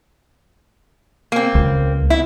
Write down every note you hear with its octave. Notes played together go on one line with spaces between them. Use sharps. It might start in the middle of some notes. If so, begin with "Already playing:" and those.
A#3 C4
C#2
E4